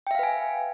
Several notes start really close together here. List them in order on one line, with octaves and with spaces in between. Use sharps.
G5 E5 F5 B4 G#5